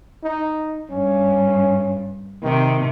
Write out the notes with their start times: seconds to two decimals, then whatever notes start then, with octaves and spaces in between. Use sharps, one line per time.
0.24 D#4
0.90 G2 C#4
2.43 C3 D#3